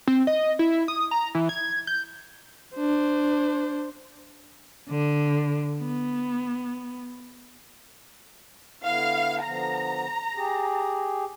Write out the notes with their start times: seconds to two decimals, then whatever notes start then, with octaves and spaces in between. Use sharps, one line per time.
0.08 C4
0.27 D#5
0.59 E4
0.88 D#6
1.11 A#5
1.35 E3
1.49 G#6
1.87 G6
2.75 D4 C5
4.89 D3
5.79 B3
8.83 D3 B3 E4 F5
9.44 D3 F3 B3 A#5
10.36 G4 G#4